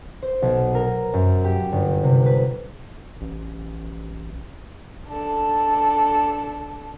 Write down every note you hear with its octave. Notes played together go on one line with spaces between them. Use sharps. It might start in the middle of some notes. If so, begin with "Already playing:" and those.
C5
B1
A#4
F#2
G4
G1
C3
B4
A1
D4 A4